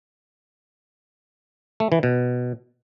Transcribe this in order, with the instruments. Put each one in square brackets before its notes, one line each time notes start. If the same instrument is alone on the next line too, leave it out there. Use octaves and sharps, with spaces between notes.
[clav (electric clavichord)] A3
E3
B2